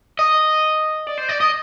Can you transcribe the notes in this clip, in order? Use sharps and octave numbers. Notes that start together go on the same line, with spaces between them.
D#5
D5
C5
D5
D#5